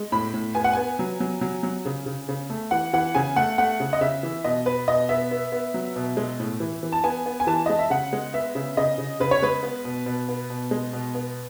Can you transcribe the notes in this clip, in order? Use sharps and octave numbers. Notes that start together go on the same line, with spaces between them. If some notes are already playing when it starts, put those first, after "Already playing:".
Already playing: G#3
A2 B5
A2
B3 G#5
F#5
B3 G#5
F#3
F#3
F#3
F#3
C#3
C#3
C#3
A3
E3 F#5
E3 F#5
C#3 G#5
A3 F#5
A3 F#5
C#3
D#5
C#3 E5
E3
B2 D#5
B3 B4
B2 D#5
B3 E5
B3
B3
F#3
B2
G#3
A2
E3
E3
A5
B3 G#5
B3
G#5
E3 A5
G#3 D#5
E5
C#3 F#5
G#3
B3 E5
C#3
C#3 D#5
C#3
C#3 B4
C#5
G#3 B4
B3
B2
B2
B3
B2
G#3
B2
B3